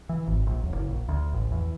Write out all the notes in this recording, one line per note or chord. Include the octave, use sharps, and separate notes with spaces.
E3
G#1
A#1
D#1
F#1
A#1
D2
A1
E2